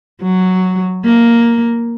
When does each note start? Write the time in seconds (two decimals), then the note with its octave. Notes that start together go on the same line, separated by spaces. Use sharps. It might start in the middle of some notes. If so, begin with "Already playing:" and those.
0.22 F#3
1.05 A#3